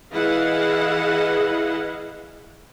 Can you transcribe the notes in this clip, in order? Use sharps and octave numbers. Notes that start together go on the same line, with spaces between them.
E3 E4 G#4 D#5 F5 F#5